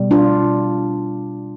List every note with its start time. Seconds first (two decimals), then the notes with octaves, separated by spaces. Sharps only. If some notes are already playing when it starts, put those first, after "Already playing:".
Already playing: B2 G3
0.11 D4 F4